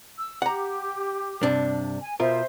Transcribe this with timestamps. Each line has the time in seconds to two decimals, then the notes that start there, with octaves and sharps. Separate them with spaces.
0.17 E6
0.42 G4 F#5 A#5
1.43 G2 C3 D4
2.02 G#5
2.20 B2 F4 A#4 C5 E5